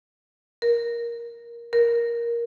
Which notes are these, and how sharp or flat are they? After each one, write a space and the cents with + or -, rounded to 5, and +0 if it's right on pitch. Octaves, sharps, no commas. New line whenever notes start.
A#4 +15
A#4 +10